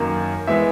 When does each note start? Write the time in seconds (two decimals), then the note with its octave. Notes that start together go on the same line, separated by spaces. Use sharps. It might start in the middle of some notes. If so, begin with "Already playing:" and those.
Already playing: F#2 D#3 A#3
0.47 E3 G#3 B3 E5